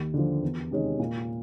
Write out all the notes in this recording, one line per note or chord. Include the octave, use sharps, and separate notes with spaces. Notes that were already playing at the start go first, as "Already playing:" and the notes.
Already playing: D#2
D3 F3
E2
C3 D#3 G#3 C#4
A#2